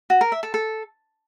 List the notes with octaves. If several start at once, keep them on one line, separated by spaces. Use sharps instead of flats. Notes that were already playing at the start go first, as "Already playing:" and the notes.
F#4
A#4
E5
A4
A4